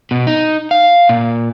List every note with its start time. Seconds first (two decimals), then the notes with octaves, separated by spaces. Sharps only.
0.11 B2
0.27 D#4
0.71 F5
1.09 A#2